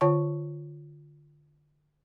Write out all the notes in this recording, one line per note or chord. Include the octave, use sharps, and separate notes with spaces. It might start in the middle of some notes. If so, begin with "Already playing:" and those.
D3 F4 C#5 A5 C#6